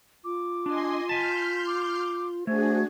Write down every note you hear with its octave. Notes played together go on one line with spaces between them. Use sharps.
F4 D6
D4 D#5 G#5 C6
G#5 A5 C6 F6 G6 B6
D6
A3 D4 F#4 G#4 C5 G#6